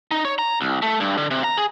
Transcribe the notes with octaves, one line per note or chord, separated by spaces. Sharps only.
D#4
C#5
A#5
C2
A3
G2
D3
C3
A#5
G#4